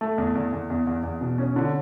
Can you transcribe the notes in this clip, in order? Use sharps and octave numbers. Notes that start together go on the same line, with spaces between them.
A3
E2
E2
E2
E2
E2
E2
B2
C#4
D3